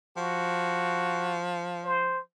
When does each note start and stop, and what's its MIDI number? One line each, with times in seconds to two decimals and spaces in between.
0.17 2.22 53
0.17 1.42 66
1.84 2.19 72